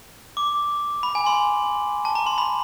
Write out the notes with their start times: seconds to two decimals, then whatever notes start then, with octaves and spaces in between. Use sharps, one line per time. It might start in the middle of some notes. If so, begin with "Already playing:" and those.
0.37 D6
1.03 B5
1.15 G#5
1.26 C6
2.05 A5
2.15 A#5
2.26 C6
2.38 B5